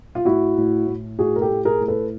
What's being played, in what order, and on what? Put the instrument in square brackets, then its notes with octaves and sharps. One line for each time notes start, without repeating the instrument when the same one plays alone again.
[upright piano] F4
A2 E4 F#4
A2
A2
A2 F#4 G#4
A#4
G4 A4
A2
G#4 A#4
A2
A4 B4